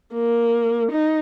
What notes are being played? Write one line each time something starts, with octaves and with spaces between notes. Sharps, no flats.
A#3
D#4